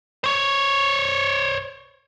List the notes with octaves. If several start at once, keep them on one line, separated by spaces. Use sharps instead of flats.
C5 C#5